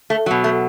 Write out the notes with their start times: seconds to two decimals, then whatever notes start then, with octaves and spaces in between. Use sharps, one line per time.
0.10 A3
0.26 B2 F#3
0.44 A3